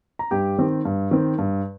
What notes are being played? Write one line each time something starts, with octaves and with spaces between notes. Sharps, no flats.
A#5
G2 G4 G5
D#3 C4
G2
D#3 C4
G2